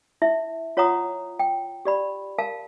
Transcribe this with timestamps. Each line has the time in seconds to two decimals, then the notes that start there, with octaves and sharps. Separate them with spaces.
0.22 E4 E5
0.77 F4 C#5 F#5 A#5 D#6
1.39 G5
1.85 G4 D5 B5
2.38 A#4 F5 A5